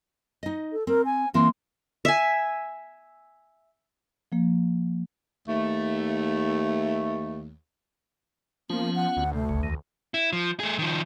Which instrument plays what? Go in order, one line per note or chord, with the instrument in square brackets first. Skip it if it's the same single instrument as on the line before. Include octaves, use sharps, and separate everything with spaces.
[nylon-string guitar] D#4 D#5
[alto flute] A4
[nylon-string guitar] C4 [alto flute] A#4
[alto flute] G#5
[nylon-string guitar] E3 A#3 C4 [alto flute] C6
[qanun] E5 G#5
[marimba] F3 A#3
[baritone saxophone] D#2 [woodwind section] A3
[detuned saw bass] F3 [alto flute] A#3 [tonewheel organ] B3 C#4 F4
[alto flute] F#5
[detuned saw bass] D2
[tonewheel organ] C3 [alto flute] A3
[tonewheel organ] G1 C#2 C#3
E2 D#3
[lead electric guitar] E4
F3
A3 G#4
D#3 F3